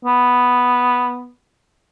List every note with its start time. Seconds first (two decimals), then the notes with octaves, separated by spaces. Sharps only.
0.05 B3